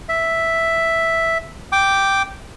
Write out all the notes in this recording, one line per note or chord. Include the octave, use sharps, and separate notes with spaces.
E5
G5 D6